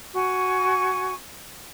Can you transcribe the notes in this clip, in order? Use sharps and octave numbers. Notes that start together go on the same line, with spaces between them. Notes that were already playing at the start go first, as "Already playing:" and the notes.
F#4 G#5 C#6